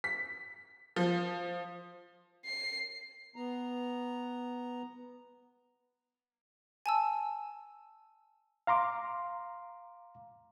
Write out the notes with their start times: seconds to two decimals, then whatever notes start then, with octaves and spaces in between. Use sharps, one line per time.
0.04 B6
0.96 F3
2.45 C7
3.36 B3 A#5
6.86 G#5 A5 E6
8.67 F5 A#5 C6 D6